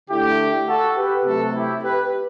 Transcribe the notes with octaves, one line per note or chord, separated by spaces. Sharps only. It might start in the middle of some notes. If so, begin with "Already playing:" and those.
D3 A3 E4 G4
F#4 A4
G4 B4
C3 F#3 A3 F#4 A4
E4 G4
G4 B4